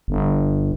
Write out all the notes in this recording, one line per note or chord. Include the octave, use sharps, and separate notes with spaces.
G1